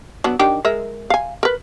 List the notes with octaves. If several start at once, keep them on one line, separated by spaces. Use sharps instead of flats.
F#3 B3 D4
D#3 D4 G4
G#3 A#4 E5
F5 G#5
A#4 B4